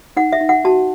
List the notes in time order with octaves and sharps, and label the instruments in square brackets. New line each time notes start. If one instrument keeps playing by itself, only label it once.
[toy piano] D#4 F#5
E5
D#4
F#5
F#4 A5